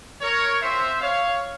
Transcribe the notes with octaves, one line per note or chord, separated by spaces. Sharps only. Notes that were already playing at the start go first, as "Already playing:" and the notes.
A#4 C#5
C4 F4 C5 E5
C#5 F5